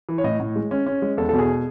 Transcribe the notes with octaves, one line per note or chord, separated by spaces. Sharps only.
E3
C#5
A2 D#5
A2
G#3
C#4
C#4
G#3
E2 A4
B2 A4
G#4